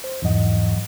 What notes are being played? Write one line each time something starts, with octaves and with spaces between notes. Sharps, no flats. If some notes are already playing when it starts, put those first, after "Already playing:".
C5
E2 G#2 E3 F#3 D#5 F#5